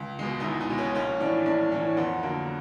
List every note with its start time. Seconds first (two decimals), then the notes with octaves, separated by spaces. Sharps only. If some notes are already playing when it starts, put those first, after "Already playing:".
Already playing: C#2
0.19 B2 G#3
0.40 D#4
0.44 C#2 E4
0.60 D#4
0.69 B2 G#3
0.78 C#4
0.95 A#1 C#4
1.20 A2 E3 D4
1.46 A#1 D4
1.72 A2 E3 C#4
1.97 F2 B3
2.23 D3 F#3 A#3